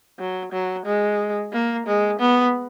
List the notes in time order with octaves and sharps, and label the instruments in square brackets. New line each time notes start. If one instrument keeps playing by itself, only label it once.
[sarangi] F#3
F#3
G#3
A#3
G#3
B3